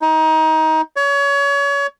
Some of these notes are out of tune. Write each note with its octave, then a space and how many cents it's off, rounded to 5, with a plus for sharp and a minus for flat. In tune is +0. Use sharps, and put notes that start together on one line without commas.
D#4 +25
C#5 +30